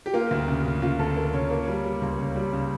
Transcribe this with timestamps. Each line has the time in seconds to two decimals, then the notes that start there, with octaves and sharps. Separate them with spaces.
0.06 G4
0.14 A#3 F4
0.31 D2
0.48 C#3
0.65 C#3
0.82 C#3 F4
0.99 D2 A4
1.16 A#3
1.33 C#3 C#5
1.50 A#3
1.68 G3
1.84 G3
2.02 C#2
2.18 C#3
2.36 G3
2.53 C#3